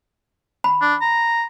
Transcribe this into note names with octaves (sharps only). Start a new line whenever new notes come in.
B5
D4
A#5